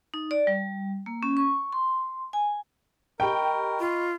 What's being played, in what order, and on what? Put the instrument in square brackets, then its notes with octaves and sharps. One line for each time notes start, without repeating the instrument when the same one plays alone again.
[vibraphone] D#4
D5
G3
A#3
C#4
C#6
C6
G#5
[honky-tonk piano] G4 G5 [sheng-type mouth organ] A#4 [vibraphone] D#5 B5 C#6
[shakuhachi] F4